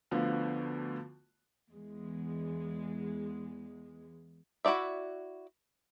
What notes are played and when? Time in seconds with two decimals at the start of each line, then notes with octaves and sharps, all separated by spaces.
0.11 D2 D3 F3 B3
1.70 E2 G#3
4.65 E4 F#4 C#5 D5 E5